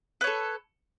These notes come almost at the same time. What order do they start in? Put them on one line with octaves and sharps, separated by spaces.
B4 C#5 A4